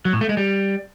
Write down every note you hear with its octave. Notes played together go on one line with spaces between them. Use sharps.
F#3
A2
A3
G#3
G3